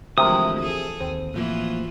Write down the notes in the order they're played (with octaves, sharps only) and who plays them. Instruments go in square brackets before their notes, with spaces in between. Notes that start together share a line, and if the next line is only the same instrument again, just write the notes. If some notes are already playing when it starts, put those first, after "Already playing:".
[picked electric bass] D2 [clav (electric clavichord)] C3 A#4 [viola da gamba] E3 F3 G#3 [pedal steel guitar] D#6
[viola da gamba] G#4 A4
[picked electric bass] D#2 [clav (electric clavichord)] C4
[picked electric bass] A2 F3 A#3 [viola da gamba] E3 F4 F#4